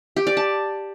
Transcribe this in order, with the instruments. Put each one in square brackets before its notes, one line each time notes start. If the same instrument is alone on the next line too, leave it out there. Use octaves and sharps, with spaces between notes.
[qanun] G4
D5
A5